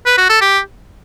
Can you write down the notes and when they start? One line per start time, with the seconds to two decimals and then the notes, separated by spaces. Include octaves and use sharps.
0.06 B4
0.18 F#4
0.29 A4
0.41 G4